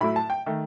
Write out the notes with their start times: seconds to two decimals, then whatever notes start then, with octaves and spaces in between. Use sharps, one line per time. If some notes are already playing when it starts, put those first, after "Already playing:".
0.01 A2 F#3 A3 E4 B5
0.16 A5
0.30 G5
0.46 D#3 A3